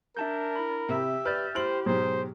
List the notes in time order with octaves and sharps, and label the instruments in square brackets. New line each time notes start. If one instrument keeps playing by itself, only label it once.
[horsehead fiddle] D4 [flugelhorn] A#4 [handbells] E5 A5 G6
[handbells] E4 B5
[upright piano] C3 [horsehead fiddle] G4 E5
[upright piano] B4 D5 [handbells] F6 G6 A6
[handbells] E4 [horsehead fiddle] G4 [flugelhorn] C5 [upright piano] F6 D7 F#7
[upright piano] G#2 B2 F#3 [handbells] G#4 [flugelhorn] C5